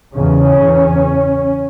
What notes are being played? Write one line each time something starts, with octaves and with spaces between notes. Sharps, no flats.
E2 C#3 C#4
E2 C#3